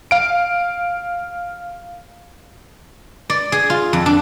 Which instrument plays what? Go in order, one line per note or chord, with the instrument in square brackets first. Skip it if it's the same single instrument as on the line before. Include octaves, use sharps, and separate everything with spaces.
[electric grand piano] F5 D7
[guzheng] D5
G#4
F4
F2
D4